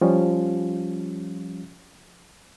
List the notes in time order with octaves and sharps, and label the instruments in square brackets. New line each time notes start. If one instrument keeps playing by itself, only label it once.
[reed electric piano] F3 G3 C#4 F4